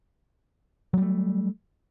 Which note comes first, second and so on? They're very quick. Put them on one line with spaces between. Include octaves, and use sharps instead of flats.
F#3 G3 A3